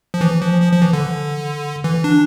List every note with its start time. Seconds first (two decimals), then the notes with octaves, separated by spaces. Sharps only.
0.14 F3
0.21 E3
0.42 F3
0.62 F3
0.73 F3
0.82 E3
0.93 D3
1.84 E3
2.04 D4